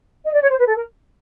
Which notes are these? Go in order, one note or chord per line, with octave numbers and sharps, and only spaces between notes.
D#5
D5
C#5
C5
B4
A4
A#4